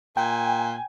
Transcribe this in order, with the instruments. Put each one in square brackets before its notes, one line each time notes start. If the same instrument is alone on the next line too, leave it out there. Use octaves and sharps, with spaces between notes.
[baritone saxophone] A#2 [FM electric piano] G5 [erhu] G#5